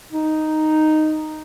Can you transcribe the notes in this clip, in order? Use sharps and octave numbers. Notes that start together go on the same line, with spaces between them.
D#4